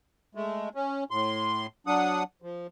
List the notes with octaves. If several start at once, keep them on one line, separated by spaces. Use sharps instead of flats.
G#3 A3
C#4
A2 C6
F#3 D4 F#5 D#6
F3